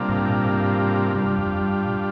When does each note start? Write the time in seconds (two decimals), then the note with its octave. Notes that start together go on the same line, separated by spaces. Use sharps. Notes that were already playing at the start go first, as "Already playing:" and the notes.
Already playing: C3 G3 A#3 D4 F4
0.09 G#2
0.27 A#2
0.45 G#2
1.15 G2 G3 D4 F4
1.38 F2
1.61 G2
1.85 A#2